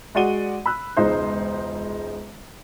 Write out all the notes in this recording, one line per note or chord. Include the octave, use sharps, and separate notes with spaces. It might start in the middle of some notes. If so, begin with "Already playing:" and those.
G#3 F#4 D5 F#5 D#7 G7
B5 E6 F#6
E1 C#2 D#4 C5